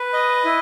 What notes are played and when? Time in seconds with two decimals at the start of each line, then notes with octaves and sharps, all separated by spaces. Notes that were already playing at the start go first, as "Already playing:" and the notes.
Already playing: B4
0.13 D#5
0.45 E4